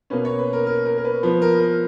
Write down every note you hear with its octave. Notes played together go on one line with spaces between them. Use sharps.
B2 A#3 C#4 B4
C#5
B4
A#4
A#4
A#4
A#4
B4
F3 B3 B4
A#4
A#4